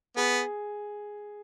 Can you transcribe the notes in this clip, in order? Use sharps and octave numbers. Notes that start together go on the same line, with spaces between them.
B3 G#4